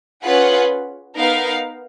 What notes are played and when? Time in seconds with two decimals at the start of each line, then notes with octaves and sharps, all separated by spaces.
0.23 C#4 F4 G#4 B4 F#5
1.16 B3 D#4 A#4 F5